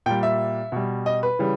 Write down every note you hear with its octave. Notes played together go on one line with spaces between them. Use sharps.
A#2 G3 G5
E5
B2 G3
D#5
B4
C#3 E3 G3